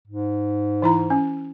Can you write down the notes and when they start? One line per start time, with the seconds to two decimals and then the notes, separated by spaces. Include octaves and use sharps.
0.07 G#2
0.82 E3 E4 A#5
1.10 C#4